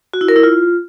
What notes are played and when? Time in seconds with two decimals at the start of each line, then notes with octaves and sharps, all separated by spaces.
0.14 F#4
0.21 E4
0.28 A#4
0.36 E4
0.43 F4